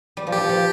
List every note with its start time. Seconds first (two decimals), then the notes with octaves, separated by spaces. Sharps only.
0.17 G3
0.27 F3
0.32 G4
0.38 F3
0.49 F3